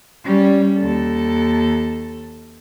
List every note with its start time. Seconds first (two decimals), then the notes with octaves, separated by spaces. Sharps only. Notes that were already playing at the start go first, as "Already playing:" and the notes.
0.24 G3 C#4
0.78 D#2 A4